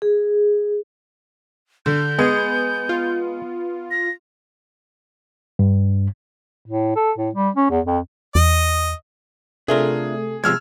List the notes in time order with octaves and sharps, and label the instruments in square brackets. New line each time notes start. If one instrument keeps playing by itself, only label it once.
[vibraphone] G#4
[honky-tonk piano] D3 [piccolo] G6
[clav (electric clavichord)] G#3 G#4 [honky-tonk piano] B3
[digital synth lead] F4
[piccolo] A#6
[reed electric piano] G2
[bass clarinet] A2
A4
A2
G3
C#4
E2
F2
[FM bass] E2 [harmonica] D#5
[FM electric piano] C3 A3 [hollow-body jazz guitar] D4 F4 A#4 [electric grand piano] G#4
[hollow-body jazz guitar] C3 F3 G#3 [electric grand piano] E6 F6 G#6